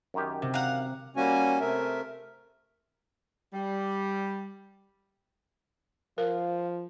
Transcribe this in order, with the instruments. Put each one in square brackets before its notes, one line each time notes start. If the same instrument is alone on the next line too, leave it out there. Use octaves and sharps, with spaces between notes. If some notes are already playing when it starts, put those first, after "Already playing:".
[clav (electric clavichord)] F#2 D#3 G4
[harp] C3
[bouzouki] F5 F#5 [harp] A#5
[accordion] G3 A#3 C#4 F#4 G#5
C3 A3 A#4 E5
[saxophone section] G3
[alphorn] F3 [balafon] A#4 [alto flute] F5